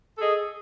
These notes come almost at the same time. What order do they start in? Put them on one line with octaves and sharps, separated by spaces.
A4 G#4 D#5